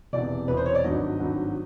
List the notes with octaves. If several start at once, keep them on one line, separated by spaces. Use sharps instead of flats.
E1 E2 C3 D5
E1 E2 C3 B4
C5
C#5
D5
G#1 G2 D#3 F#3 D#5
G#1 G2 D#3 F#3